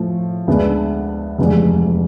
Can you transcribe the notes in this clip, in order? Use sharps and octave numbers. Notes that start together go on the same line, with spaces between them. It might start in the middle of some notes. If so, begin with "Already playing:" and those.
Already playing: A2 F3 A3
D2 D3 G#3 B3 D4
F1 E2 D3 G#3